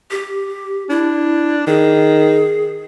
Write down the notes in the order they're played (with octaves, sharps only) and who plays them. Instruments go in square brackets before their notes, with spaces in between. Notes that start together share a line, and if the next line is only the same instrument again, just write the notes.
[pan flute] G4
[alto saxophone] D4 [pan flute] E4
[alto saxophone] D#3 [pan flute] G#4